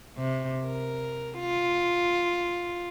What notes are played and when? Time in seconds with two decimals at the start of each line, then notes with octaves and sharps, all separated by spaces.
0.18 C3
0.65 A#4
1.40 F4